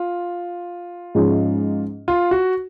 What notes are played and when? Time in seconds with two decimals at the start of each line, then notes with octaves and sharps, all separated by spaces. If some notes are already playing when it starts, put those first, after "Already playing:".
Already playing: F4
1.15 G#2 F3 G#3 C#4
2.08 F4
2.31 F#4